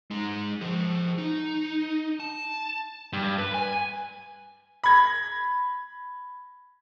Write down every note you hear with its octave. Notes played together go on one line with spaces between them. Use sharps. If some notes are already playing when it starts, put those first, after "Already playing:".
G#3 D#4
F3 G#4
D#4
A5
G2
B4
G#5
B5 G#6 A#6